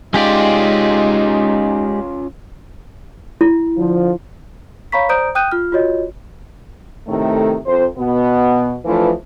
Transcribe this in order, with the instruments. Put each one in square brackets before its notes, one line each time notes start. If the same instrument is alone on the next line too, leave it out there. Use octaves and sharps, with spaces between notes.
[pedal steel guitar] G#3 G4 D5 [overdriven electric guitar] C#4 F4 [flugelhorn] D#4
[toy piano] E4
[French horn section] D3 F3
[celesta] C#5 F5 A#5 B5 C#6 B6
C5 D5 A#5 D#6 G6 D7
G5 D#6 F#6 G6 D#7
F4 F6
F4 F#4 C#5 D#5
[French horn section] A2 C3 D#3 A3
F2 C5
B2 B3
E3 F3 A3 D4 F4 B4